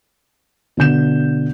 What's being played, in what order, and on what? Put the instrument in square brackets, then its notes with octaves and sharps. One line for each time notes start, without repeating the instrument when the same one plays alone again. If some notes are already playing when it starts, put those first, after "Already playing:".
[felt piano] B2 D3 G6 E7